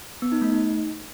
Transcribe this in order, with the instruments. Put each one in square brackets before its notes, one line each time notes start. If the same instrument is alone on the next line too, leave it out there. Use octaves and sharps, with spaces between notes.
[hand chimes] B3
D#4
A3
D#4